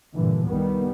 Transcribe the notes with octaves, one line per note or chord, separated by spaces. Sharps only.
G2 A#2 D3 E3
C2 D#3 G3 B3